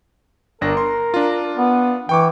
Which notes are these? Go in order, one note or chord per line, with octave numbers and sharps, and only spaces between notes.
G1 D4 A#4 A#6
C6
D4 F4
B3
E3 G5 C#6 D6